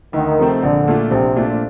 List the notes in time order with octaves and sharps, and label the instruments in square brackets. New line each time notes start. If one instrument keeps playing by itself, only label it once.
[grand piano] D2 [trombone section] D#3
[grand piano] C3 F3 A3 C4
[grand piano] A#1 [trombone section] D3
[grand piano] A#2 A3 D4 F4
[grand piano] A#1 [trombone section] C3
[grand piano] A#2 A3 D4 F4